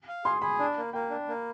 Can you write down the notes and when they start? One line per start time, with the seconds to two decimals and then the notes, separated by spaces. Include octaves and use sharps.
0.08 F5
0.24 G#4 C6
0.42 G#4 B5
0.59 D4
0.77 A#3
0.93 A#3 G5
1.10 D4
1.29 A#3